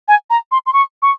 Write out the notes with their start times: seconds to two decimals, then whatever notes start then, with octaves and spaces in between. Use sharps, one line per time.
0.08 G#5
0.30 A#5
0.52 C6
0.66 C6
0.73 C#6
1.02 C#6